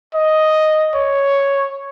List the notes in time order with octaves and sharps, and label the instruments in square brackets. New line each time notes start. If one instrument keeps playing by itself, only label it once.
[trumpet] D#5
C#5